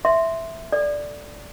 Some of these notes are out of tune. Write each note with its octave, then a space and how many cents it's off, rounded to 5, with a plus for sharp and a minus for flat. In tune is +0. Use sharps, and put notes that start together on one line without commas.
E5 +0 C6 +0
A4 +0 D5 +0